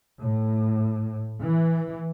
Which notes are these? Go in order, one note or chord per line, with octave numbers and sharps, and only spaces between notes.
A2
E3